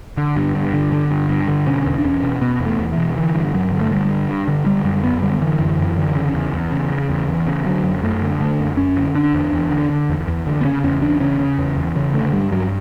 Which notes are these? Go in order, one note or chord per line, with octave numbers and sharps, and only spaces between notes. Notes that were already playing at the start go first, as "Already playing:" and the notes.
D3
G2
G2
D3
D3
G2
G2
D3
B2 C#4
E2
D4
E2 C#4
B2
B2 B3
E2
A3
E2
E3
B2
D3 E3
G2
G2 F#3
D3
A3
D3 G3
G2
G2
D3
D3 G3
F#2 G3
F#2 B3
D3 G3
D3 E3
F#2
F#2
D3
C#3
E2
E2
C#3
C#3
E2
E2
C#3
D3 F#3
F#2
F#2 A3
D3
D3 A3
F#2
F#2 C#4
D3
D3 D4
E2
E2
D3
D3
E2
E2
D3
B3
C#3 C#4
E2 C#4
E2 D4
C#3 C#4
C#3
E2
E2
C#3
D3 A3
G2 G3
G2 F#3